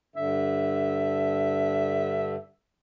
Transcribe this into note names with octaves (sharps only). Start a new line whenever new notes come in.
G2 D3 E5